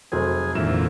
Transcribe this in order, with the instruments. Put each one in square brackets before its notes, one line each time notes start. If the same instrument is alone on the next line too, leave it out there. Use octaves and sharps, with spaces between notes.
[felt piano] F1 F#3 C4 [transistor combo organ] G#4
[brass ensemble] G#1 D3 F3 [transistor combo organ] F2 A#2 E3 [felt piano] E5 E7